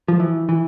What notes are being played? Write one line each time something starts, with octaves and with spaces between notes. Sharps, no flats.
F3
E3
E3